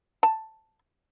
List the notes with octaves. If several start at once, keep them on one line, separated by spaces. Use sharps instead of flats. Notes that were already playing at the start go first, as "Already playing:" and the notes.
A5